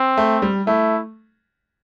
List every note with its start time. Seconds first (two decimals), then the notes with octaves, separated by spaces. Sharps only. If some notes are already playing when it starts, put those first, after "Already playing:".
Already playing: C4
0.17 A3
0.42 G3
0.67 A3 E4